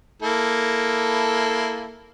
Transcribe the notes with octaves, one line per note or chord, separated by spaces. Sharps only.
A#3 E4 A4